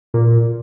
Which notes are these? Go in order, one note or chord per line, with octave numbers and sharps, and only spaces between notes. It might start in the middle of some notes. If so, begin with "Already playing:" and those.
A#2